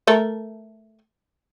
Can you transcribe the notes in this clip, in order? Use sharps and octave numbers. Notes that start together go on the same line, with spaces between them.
A3 A4 A#4